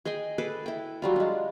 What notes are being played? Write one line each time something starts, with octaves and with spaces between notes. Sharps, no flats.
G#4 D#5 G5 G#5
G#4 A4 B4 D6
E4 G5
F#3 G3 F4
G#3 D4